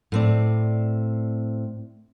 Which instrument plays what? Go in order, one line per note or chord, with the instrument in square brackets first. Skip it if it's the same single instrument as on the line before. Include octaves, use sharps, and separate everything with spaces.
[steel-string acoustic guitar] A2 C4 D5